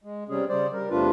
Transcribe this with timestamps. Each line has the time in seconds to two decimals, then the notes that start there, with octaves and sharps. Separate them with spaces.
0.04 G#3
0.29 C3 G3 C#4 G#4
0.49 C#3 G3 C5 D5
0.73 G3 A#4
0.90 E2 C3 A3 D4 F4 B4